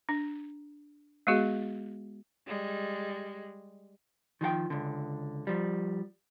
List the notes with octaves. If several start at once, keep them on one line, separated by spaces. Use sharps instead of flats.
D4
G#3 B3 F#4 G#4
G3 G#3
D#3 F3 G4 G5
C#2 D3
F3 G3